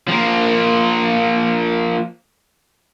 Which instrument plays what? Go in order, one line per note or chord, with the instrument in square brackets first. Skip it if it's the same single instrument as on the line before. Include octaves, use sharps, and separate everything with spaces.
[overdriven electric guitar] F3 A#3